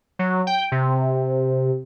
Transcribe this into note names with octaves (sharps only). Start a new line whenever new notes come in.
F#3
G5
C3